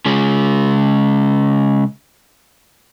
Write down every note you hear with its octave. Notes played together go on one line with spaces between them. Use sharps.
C#3 G#3